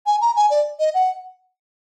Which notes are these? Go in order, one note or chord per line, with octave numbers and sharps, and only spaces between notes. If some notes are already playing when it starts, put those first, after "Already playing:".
G#5
A#5
G#5
D5
D#5
F#5